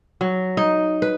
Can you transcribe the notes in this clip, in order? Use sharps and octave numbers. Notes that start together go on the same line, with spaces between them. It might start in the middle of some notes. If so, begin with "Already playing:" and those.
F#3
D#4
B4